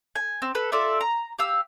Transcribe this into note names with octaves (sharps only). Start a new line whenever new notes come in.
G#5
C4
A4 B4
F4 A4 D5 E5
A#5
G4 F5 E6